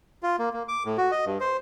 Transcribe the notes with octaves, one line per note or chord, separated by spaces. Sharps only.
F4
A#3
A#3
D6
A2
F#4
D#5
G2
C5